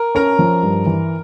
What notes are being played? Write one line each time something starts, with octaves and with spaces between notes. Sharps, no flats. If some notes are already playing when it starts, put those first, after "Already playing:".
Already playing: A#4
C#4 A#4 A#5
F3
G2
E3